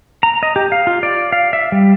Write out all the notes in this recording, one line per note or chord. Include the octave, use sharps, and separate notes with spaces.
A#5
D#5
G4
F5
F4
D5
F5
E5
G3